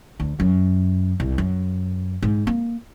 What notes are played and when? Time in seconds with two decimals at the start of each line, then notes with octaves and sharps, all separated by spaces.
0.20 D2
0.40 F#2
1.20 C2
1.38 F#2
2.22 G#2
2.47 A#3